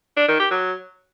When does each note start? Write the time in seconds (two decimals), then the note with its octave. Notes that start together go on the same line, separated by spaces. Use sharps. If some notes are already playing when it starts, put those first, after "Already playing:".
0.17 D4
0.28 D#3
0.40 G4
0.51 F#3